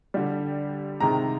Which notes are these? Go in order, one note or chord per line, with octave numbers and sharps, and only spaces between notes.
D3 G3
C3 D#3 G#3 A#5